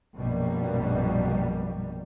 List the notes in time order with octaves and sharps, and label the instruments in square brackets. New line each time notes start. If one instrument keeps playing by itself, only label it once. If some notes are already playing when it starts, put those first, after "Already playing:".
[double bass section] A#1 F#2 B2 G3 A#3